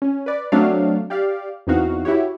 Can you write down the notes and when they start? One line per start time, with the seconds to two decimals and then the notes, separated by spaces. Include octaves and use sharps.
0.02 C#4
0.26 B4 D5
0.52 F#3 A3 C4 D4 A4 F5
1.10 G4 D5 F5
1.67 E2 E3 C4 D#4 F#4 F5
2.05 E4 F#4 G4 C#5